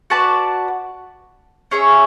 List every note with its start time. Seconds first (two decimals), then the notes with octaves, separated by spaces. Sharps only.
0.10 F#4 B4 D5 A5
1.71 C#4 G#4 C#5 E5